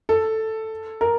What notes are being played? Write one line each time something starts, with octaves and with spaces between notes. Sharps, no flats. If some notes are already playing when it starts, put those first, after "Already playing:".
A4
A#4